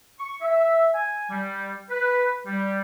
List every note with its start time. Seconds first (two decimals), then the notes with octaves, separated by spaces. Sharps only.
0.19 C#6
0.41 E5
0.94 G#5
1.30 G3
1.89 B4
2.46 G3